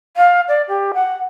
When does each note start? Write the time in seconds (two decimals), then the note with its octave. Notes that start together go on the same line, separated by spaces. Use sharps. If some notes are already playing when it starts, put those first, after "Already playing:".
0.17 F5
0.48 D5
0.68 G4
0.94 F#5